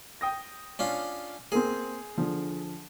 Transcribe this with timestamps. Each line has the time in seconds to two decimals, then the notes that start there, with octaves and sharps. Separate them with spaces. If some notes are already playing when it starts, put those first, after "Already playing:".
0.21 G5 D#6 A#6
0.79 C#4 D4 F4
1.52 A#3 C4 G#4
2.18 D3 F3